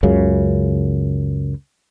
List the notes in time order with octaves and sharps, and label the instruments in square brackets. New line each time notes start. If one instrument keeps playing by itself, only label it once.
[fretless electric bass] C#2 F#2 C#3